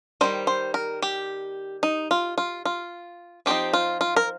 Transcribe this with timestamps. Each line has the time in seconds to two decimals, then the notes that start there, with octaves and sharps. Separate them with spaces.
0.21 D#3 G3 D#4 C5
0.47 C5
0.74 A#4
1.02 G4
1.83 D#4
2.11 F4
2.38 F4
2.65 F4
3.46 F3 C4 D#4 G4
3.73 F4
4.01 F4
4.16 A#4